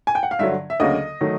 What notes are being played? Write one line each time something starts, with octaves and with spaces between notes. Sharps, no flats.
G#5
G5
F#5
F5
G2 D3 F#3 E5
E5
D2 C#3 F#3 A#3 D#5
D#3 F#3 A3